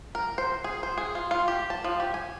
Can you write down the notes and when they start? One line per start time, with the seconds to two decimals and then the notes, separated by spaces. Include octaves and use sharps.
0.15 A#4
0.38 C5
0.64 G#4
0.83 C5
0.98 G#4
1.15 F4
1.31 F4
1.48 G4
1.70 A5
1.84 F3
2.00 G4
2.14 G#5